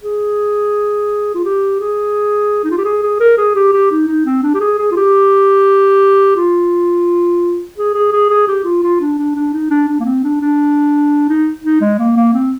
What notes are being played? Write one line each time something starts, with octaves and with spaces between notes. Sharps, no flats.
G#4
F4
G4
G#4
D#4
F4
G4
G#4
G#4
A#4
G#4
G4
G4
D#4
D#4
C4
D4
G4
G#4
G#4
F4
G4
F4
G#4
G#4
G#4
G#4
G4
F4
F4
D4
D4
D4
D#4
D4
D4
A#3
C4
D4
D4
D#4
D#4
G#3
A#3
A#3
C4